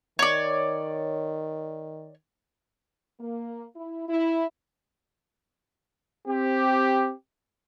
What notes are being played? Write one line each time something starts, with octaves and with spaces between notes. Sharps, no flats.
D#3 C#5 D5
A#3
E4
E4
C4 G4